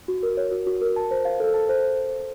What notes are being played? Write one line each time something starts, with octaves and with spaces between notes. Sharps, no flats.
F#4
A#4
C#5
F#4
F#4
A#4
A5
C5
F5
A4
A5
C5